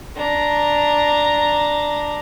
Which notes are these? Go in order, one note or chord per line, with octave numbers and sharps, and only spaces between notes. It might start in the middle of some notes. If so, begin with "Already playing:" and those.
D4 A#5